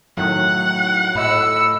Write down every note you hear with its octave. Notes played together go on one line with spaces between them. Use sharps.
A2 D#3 F#3 F#5
A2 D#5 B5 E6 C#7